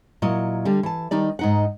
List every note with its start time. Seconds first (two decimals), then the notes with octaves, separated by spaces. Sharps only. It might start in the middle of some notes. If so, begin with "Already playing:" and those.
0.22 A#2 F#3 E4 D#5
0.65 D3 G3
0.83 E3 A5
1.11 D#3 G3 D#4 D5
1.39 G#2 D#4 F#5